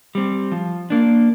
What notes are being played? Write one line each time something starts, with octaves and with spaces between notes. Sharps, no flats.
G3 C4
F3
A#3 D4